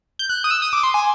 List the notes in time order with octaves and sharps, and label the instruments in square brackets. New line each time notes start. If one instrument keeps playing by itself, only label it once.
[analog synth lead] G6
F#6
D#6
E6
D#6
D6
C6
G#5